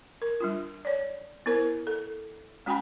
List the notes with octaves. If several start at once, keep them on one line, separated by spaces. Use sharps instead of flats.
A#4
G3 D4 F4
C#5 D5
B3 E4 A#4 C5
A4
G#3 C#4 F#4 G5 G#5 B5